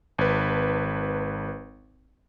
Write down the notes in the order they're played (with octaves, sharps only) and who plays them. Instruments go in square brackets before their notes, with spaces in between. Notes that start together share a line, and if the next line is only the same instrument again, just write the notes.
[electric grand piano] G#1 B4